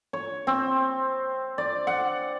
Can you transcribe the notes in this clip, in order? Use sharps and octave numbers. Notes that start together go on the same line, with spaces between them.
C#5
C4
D5
F#5